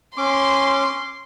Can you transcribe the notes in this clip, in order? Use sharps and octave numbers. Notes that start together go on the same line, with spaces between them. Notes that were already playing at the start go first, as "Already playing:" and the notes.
C#4 C6 D6